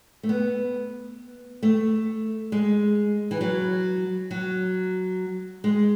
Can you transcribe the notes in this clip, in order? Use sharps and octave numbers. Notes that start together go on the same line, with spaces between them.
A3
B3
A3
G#3
E3
F#3
F#3
G#3